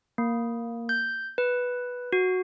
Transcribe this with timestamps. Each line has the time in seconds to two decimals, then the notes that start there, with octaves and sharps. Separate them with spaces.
0.18 A#3
0.89 G6
1.38 B4
2.13 F#4